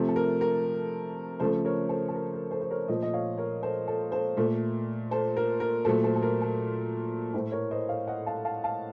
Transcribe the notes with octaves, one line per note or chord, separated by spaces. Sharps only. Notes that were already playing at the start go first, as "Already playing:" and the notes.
Already playing: C3 F3 A3
A4
A#4
A#4
C#3 F3 A3 A4 C5
A#4 C#5
A4 C5
A4
A#4
A#4
A4 C5
C5
A#4 C#5
A#2 F3 A3 C5 D#5
D#5
C#5 F5
A#4 C#5
A4 C5
A4
A4 C5
A#2 A3
A4 C5
A#4
A#4
A#2 F#3 A3 A4 C5
A4 C5
A4
A#4
A4
A2 A3 A4 C5
A#4 C#5
C5 D#5
C#5 F5
D#5 F#5
F5 A5
F5 A5
F5 A5